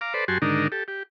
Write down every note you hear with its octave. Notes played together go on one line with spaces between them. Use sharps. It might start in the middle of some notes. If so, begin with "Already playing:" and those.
F5 A#5 D6
A4 B4 C5 D5
F#2 F#4 G4 G#5 A5 C6
G#2 D3 D#3 D4 D#4 A#4
G4 A4
G4